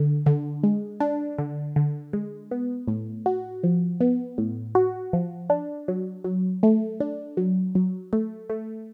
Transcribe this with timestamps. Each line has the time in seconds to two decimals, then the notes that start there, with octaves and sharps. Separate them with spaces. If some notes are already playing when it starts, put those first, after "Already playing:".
Already playing: D3
0.26 D3
0.63 G#3
1.00 D4
1.38 D3
1.76 D3
2.13 G#3
2.51 B3
2.88 A2
3.26 F#4
3.63 F3
4.01 B3
4.38 A2
4.75 F#4
5.13 F3
5.50 D4
5.88 F#3
6.24 F#3
6.63 A3
7.00 D4
7.37 F#3
7.75 F#3
8.13 A3
8.50 A3